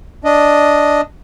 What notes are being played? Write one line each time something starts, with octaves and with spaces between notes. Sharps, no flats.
D4 D#5